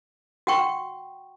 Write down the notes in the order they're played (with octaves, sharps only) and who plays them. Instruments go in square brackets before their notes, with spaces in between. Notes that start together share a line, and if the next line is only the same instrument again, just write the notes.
[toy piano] F#4 F#5 G5 C#6